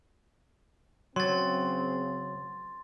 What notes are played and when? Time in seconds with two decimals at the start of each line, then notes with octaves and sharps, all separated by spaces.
1.16 C#3 F#3 C4 C6 A6